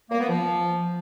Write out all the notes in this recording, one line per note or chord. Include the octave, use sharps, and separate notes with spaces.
A#3
B3
F3